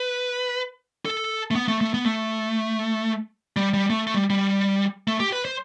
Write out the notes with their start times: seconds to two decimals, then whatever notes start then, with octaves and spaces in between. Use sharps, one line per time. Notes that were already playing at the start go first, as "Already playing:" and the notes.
Already playing: B4
1.05 A4
1.51 A3
1.55 B3
1.68 A3
1.81 A3
1.94 B3
2.06 A3
3.56 G3
3.74 G3
3.90 A3
4.07 A3
4.14 G3
4.30 G3
5.08 A3
5.20 G4
5.33 B4
5.45 C5